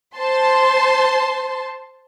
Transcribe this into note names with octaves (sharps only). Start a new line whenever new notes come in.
C5 A5 C6